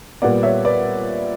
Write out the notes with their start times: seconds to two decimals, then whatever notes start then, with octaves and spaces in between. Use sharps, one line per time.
0.22 A#2 G3 B3 D5 F#5
0.43 C#5 E5
0.65 B4 D5